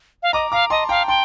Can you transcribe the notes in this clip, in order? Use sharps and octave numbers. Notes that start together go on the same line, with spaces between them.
F5
D#5 A#5 D6
F5 A#5 D6
D#5 A5 C6
F5 G5 A#5
G5 A5 C6